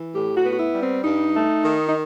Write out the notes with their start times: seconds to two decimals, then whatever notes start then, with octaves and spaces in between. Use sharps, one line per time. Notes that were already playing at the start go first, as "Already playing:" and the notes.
Already playing: E3
0.13 A2 G4
0.36 F#4
0.44 B3
0.53 F#4
0.59 E4
0.74 G3
0.82 C4
1.04 G2 D#4
1.34 A3
1.64 D#3
1.88 D#4